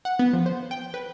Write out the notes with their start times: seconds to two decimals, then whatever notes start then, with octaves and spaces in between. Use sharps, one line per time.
0.05 F#5
0.19 B3
0.33 F3
0.46 C5
0.71 G5
0.94 B4